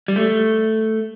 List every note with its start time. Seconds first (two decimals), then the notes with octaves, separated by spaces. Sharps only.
0.08 G3
0.16 A3